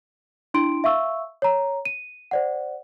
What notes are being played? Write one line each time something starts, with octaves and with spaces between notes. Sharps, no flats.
D4 E4 C6 D7
E5 F5 C#6 E6
C#5 A#5
D#7
C5 D5 F#5